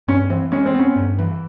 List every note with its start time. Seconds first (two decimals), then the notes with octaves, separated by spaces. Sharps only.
0.08 G2 C#4
0.30 E3 C4
0.52 G#3 C#4
0.66 C4
0.75 B3 C#4
0.96 G2
1.19 E3